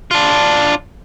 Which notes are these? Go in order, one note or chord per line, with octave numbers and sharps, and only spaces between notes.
D4 F4